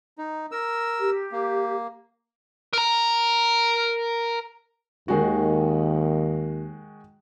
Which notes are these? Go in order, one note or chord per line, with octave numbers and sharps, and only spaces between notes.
D#4
A#4 E6
G4
A#3
A#4 A#5
D#2 D#3 G#3 F#4